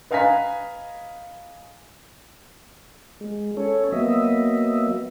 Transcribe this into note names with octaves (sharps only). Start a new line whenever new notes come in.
B4 D#5 F5 G#5 A#5 B6
G#3
C#4 A4 C#5
F#3 A#3 B3 D#5 E5